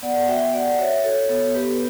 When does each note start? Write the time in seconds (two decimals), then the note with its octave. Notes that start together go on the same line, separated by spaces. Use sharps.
0.02 B3 D5 F#5
0.28 F#4 E5 G5
0.53 F#4 D5 F#5
0.79 F#4 C#5 E5
1.04 F#4 A4 C#5
1.29 B3 A4 C#5
1.54 B3 G4 B4